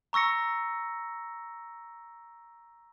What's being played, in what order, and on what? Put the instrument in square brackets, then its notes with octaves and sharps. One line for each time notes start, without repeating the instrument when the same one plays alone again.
[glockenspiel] A#5 C#6 E6 A#6 C#7